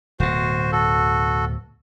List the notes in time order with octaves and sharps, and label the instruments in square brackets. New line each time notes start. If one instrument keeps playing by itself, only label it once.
[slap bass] D1 B2 [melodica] F#4 C5
[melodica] F#4 A4